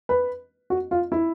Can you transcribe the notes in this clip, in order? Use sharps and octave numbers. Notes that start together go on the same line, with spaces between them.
B4
F#4
F4
E4